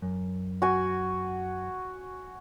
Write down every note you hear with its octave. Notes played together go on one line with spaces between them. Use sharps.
F#2
F#4 G#5